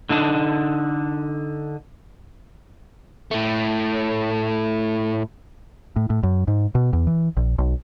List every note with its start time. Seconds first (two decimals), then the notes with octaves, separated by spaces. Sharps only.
0.09 D3 D4 D#4 A5
3.31 A2 A3
5.96 A2
6.10 A2
6.23 F#2
6.48 G#2
6.75 B2
6.93 E2
7.07 E3
7.37 A#1
7.58 B1